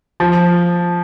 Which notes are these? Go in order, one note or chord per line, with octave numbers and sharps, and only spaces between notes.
F3